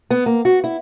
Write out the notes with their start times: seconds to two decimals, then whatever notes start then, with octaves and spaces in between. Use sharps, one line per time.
0.10 B3
0.26 A#3
0.45 F#4
0.64 E4